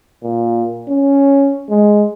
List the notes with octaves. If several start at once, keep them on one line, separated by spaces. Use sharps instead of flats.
A#2
C#4
G#3